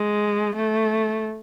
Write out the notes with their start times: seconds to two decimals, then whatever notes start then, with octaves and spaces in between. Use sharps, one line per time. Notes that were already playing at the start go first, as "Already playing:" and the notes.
Already playing: G#3
0.55 A3